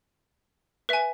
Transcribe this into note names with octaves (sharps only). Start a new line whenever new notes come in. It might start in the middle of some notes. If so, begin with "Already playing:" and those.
B4 E5 G#5